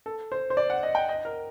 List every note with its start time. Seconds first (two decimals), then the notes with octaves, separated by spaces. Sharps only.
0.06 A4
0.32 C5
0.50 C5
0.57 D5
0.70 F#5
0.83 D#5
0.95 G5
1.09 D#5
1.25 A#4